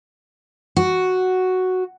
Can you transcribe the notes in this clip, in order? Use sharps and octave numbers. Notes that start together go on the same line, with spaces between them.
F#4